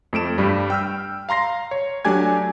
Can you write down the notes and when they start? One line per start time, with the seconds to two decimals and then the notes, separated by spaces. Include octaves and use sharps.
0.13 F2 A3 D7 E7
0.38 G2 G3
0.70 G5 E6 F6
1.29 F5 A#5 C6 A#6 C7
1.71 C#5
2.05 F#3 A3 D4 G4 G#5 G#6